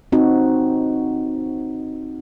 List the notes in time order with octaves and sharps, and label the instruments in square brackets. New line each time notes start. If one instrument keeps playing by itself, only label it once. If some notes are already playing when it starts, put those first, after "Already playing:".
[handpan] C4 D#4 F#4